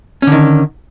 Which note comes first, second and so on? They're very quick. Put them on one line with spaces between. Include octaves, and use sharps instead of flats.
C#4 D3 D#3